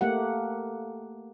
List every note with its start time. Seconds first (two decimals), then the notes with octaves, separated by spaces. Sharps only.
0.01 A3 A#3 G4 F#5